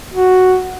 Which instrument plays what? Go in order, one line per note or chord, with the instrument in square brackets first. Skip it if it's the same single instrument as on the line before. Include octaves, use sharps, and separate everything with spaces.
[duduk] F#4